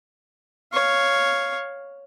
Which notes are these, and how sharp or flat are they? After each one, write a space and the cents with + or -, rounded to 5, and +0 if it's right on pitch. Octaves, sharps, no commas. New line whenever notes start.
C#5 +0 F5 +0